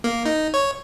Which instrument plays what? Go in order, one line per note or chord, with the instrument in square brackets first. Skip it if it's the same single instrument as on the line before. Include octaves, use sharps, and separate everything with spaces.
[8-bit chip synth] A#3
D#4
C#5